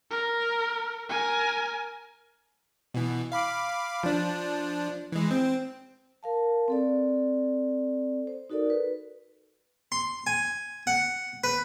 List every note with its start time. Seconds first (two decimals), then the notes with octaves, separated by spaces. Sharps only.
0.11 A#4
1.09 A#4 G#5
2.94 B2 E3
3.32 F5 B5 D6
4.03 F3 D4
5.12 E3 G#3
5.31 C4
6.23 A#4 F5 A5
6.68 C4 A4 D5
8.27 C5
8.50 D#4 F#4 A4 A#4 D5
8.70 B4
9.92 C6
10.27 G#5
10.87 F#5
11.44 B4